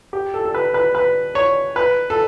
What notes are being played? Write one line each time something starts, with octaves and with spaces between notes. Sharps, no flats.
G4
A4
A4
B4
B4
B4
C#5
B4
A4